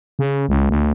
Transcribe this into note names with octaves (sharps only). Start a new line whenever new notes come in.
C#3
C#2
D2